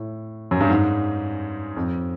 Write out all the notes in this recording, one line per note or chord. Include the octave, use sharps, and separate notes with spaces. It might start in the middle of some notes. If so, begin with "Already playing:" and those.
Already playing: A2
F#2
G2
G#2
F2